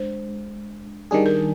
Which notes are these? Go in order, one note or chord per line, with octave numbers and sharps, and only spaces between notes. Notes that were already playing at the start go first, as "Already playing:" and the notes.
Already playing: G#3 D4 C5
D#3 G3 D4 G#4
A#4